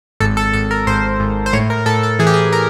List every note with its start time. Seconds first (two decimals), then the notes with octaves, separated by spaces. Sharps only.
0.20 G#1 A4
0.37 A4
0.53 G#1 A4
0.71 A#4
0.87 G#1 C5
1.20 G#1
1.46 C5
1.53 A2 C#5
1.70 A#4
1.86 A2 A4
2.03 A4
2.19 E3 G#4
2.27 G4
2.34 G#4
2.52 A#4